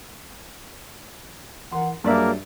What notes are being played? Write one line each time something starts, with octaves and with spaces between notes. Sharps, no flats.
E3 A#4 F#5 C6
G2 F#3 A#3 G#4 D5 E5